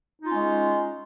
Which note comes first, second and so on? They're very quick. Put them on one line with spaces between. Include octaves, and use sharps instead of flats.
D#4 F4 C#4 G#3